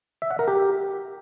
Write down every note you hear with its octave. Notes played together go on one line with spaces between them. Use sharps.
E5
F#5
A#4
G4